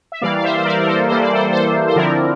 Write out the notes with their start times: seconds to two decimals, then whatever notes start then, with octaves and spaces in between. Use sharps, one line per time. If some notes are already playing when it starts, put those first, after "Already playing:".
0.12 E5
0.21 E3 G3 A#3 D5 F5
0.38 F5
0.43 C5 E5
0.58 C5
0.65 A#4 D5
0.80 A#4
0.87 A4 C5
1.09 E3 G3 A#3 C5
1.22 D5
1.34 A4 C5
1.52 A4 C5
1.87 C5
1.95 D3 F3 C4 E4 A#4 D5